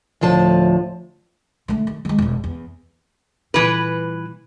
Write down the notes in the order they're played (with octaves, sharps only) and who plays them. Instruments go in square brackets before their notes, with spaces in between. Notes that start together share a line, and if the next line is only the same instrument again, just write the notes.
[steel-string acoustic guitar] D2 A2 F3 A5
[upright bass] D3 A3
D#3
D#3 G#3
E1 C2
E2
[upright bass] A#2 G3 [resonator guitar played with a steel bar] E3 B4